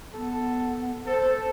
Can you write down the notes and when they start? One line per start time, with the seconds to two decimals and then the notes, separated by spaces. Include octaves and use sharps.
0.14 B3 A4
1.06 A4 C5